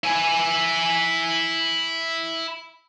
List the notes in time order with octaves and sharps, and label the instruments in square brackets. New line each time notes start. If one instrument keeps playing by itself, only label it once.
[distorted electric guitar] E4 G#5